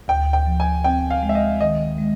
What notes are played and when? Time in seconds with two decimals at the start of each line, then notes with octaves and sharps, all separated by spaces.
0.08 D2 G5
0.33 G5
0.46 F3
0.60 G#5
0.84 C4 G5
1.10 F5
1.23 G#3
1.29 E5
1.35 D#5
1.61 D#3 D#5
1.99 G#3